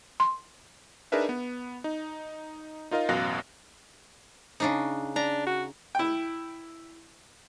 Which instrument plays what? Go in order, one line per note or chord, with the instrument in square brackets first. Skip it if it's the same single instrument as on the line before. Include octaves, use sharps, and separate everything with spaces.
[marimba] C6
[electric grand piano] D4 D#4 G#4 A#4 B4 E5
B3
D#4
D#4 F4 A#4 D#5 F5
A1 F#2 B2 F5 F#6 A#6
[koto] C#3 D4 D#4
[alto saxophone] D4 [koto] A#5
[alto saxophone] F#4
[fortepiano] E4 G5